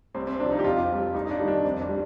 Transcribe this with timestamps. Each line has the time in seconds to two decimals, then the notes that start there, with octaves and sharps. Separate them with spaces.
0.15 C2 C4
0.27 C4
0.40 C3 D4
0.44 F3
0.51 D#4
0.59 G4
0.64 F2 F4
0.90 C3 G3
1.15 G2 D#4
1.26 D#4
1.31 D4
1.39 D#3 G3
1.48 D4
1.64 F2 C4
1.81 D4
1.89 G3